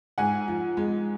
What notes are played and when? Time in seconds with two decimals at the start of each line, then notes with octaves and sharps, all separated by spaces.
0.18 G#2 F#5 G#5
0.48 F3
0.77 G#3